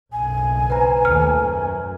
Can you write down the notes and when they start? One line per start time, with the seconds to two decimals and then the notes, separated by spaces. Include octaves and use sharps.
0.12 F#1 B1 G#5
0.70 B4 C5 A#5
1.05 D#2 A3 F6
1.40 F#2 F#3